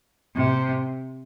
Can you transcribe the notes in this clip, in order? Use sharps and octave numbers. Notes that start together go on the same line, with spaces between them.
C3